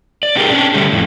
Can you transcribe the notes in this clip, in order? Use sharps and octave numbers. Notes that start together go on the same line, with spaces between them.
D5
B3 D#4 G4 G#4 A#4
C#4 D4
D3 G3 A3
F2 A2